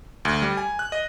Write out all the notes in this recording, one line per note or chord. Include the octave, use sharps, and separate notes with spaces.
D2
G3
G#5
F#6
D#5